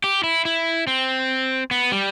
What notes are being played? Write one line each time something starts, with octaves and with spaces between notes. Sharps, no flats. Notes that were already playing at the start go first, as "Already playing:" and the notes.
G4
E4
E4
C4
B3
G3